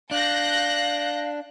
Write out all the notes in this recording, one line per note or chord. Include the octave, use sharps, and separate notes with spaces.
D4 F5 F#6 G6 A#6